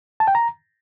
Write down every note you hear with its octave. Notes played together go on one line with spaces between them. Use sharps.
A5
G5
A#5